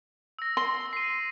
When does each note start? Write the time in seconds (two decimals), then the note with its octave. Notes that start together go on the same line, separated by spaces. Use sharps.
0.39 E6 A#6
0.57 C6
0.93 C7 D#7